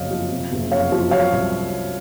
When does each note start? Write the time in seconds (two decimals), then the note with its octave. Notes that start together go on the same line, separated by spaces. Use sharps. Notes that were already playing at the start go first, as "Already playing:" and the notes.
Already playing: F#1 F2 C#3 F#3 C#5 D#5 F5
0.11 F3
0.32 C3
0.52 F#1
0.72 F2 C#5 F5
0.92 F3
1.11 F#3 C#5 F5
1.32 C2